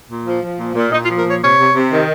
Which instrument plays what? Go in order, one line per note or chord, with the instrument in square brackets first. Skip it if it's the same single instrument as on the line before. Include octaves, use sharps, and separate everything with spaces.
[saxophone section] A#2
F3
F3
A#2
A#2
A#2 D#4
F4
F3
A#4
A#2 C#5
C3 C#5
C3
C3
D#3